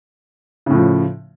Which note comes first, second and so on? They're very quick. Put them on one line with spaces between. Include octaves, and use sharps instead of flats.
C#3 A2 F3